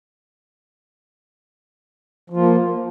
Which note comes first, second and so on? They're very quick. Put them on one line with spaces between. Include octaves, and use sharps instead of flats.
F3 F4 A#3